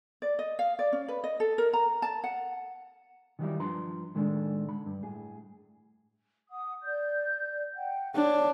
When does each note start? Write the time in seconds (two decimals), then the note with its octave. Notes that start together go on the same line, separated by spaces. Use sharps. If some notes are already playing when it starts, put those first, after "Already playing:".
0.22 D5
0.39 D#5
0.59 F5
0.79 D5
0.92 C#4
1.08 B4
1.24 D#5
1.40 A4
1.58 A#4
1.73 A#5
2.02 A5
2.24 F#5
3.39 D#3 E3 F#3 G3 D#4 E4
3.59 G2 F3 D4 B4 A#5 C6
4.15 A2 D#3 G#3 A3 C#4 D4
4.68 D3 B5
4.86 G2
5.03 A2 G#4
6.50 F#5 D#6
6.84 D5 G6
7.74 F#5 G5
8.15 D4 C#5